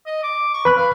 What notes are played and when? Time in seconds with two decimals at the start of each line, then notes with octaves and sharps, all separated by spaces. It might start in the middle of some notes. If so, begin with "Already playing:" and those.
0.06 D#5
0.23 D6
0.54 C#6
0.65 B4 B5 F#6
0.77 F5